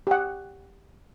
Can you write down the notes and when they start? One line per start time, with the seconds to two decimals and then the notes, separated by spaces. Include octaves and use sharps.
0.07 G4 F#5